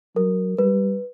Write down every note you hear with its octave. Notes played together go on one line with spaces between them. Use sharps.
F#3 A#4
G3 B4